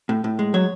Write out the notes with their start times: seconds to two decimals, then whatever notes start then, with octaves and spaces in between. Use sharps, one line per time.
0.09 A2
0.24 A2
0.39 G#3
0.54 F#3 C#5